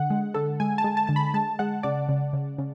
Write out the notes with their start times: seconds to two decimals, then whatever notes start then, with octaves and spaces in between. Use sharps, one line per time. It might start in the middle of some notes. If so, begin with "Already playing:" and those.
Already playing: D3 F#5
0.10 G#3
0.34 D3 A4
0.60 G#3 G#5
0.78 A5
0.84 G#3
0.97 A5
1.07 D3 A5
1.16 B5
1.34 G#3 A5
1.59 G#3 F#5
1.83 C#3 D5
2.09 C#3
2.33 C#3
2.58 C#3